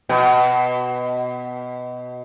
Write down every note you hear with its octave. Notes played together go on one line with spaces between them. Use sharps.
B2